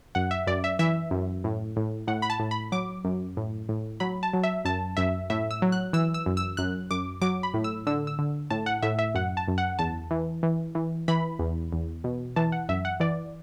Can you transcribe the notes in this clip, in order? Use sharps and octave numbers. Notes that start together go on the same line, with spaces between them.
F#2 F#5
E5
F#2 D5
E5
E3 E5
F#2
A2
A2
A2 F#5
B5
A5
A2
B5
F#3 D6
F#2
A2
A2
F#3 B5
A5
F#3
E5
F#2 A5
F#2 E5
A2 E5
E6
F#3
F#6
E3 E6
E6
F#2
E6
F#2 F#6
F#2 D6
F#3 D6
B5
A2
E6
D3 E6
E6
D3
A2 A5
F#5
A2 E5
E5
F#2 F#5
A5
F#2
F#5
E2 A5
E3
E3
E3
E3 B5
E2
E2
B2
E3 A5
F#5
F#2 E5
F#5
E3 D5